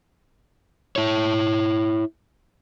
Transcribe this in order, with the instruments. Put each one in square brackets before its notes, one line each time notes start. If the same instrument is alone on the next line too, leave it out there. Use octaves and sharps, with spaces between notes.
[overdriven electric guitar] E4 C#5